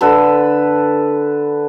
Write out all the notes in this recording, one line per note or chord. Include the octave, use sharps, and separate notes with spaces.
D3 A4 B4